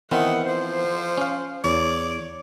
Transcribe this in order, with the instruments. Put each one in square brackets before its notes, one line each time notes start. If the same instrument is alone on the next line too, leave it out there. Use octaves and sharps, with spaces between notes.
[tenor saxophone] D#3 [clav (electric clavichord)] E3 B3 C4 [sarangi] F#5
[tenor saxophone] F3 [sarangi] C5
[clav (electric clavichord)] C#4 F5
[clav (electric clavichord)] E2 [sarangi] C#5 [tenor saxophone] D5